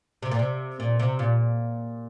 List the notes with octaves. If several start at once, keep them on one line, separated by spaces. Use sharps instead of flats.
C3
A#2
C3
A#2
C3
A#2